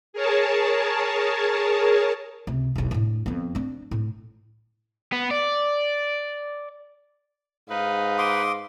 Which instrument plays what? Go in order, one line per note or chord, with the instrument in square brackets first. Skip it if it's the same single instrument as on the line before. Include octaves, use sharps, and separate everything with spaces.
[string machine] G#4 A#4 C#5 A5
[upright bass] C#2 C3
E1 B1
A2 D4
F2 B3
C4 D4
A2
[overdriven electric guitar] B3
D5
[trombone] G#2 [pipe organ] D#4 B4 [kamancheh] F5
[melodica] C6 D6 D#6